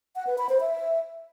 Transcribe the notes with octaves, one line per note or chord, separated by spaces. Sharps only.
F#5
B4
B5
C5
E5